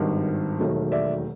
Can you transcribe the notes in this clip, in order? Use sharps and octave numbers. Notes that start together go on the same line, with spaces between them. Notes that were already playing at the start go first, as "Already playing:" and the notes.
Already playing: G#1 G2 D#3
E1 D#2 D#3 F#3 A3
D5 E5